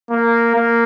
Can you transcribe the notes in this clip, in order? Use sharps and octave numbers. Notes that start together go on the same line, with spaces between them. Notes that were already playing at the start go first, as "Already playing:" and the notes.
A#3
A#3